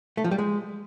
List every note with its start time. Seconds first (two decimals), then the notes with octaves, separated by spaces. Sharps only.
0.17 A3
0.24 F3
0.31 G3
0.38 G#3